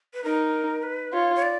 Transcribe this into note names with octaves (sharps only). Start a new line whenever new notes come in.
B4
D#4 A#4
B4
F4 C#5
C#5
D5